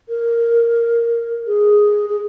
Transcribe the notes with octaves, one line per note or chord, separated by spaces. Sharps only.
A#4
G#4
G#4